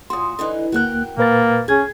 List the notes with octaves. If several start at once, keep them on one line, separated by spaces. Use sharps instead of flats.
A#2 F#4 C6 D#6
D3 E3 D#4
D2 A#3 F#4 A#4 G5 F#6
A#2 A#3 B4 A6
C2 C#4 G#4 G#6